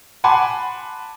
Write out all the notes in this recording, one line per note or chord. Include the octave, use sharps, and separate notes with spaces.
F#5 G#5 A5 B5 C6 D6